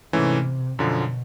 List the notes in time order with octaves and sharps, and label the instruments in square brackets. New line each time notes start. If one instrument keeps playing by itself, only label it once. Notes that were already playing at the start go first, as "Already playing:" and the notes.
[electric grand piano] G#2 E3 A3 C#4 [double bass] C3
[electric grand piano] F#2 D3 F3 [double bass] B2